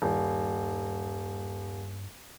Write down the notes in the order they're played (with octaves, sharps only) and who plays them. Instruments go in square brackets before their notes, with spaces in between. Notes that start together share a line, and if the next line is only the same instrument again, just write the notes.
[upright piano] D#1 [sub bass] G2